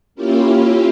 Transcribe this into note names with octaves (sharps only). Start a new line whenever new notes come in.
A#3 C#4 E4 F4 G4